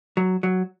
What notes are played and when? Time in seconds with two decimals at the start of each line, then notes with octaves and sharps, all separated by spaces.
0.17 F#3
0.43 F#3